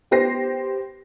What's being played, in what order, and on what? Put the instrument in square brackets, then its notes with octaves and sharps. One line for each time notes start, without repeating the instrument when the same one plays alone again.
[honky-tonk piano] B3 G4 C5 A#6 C7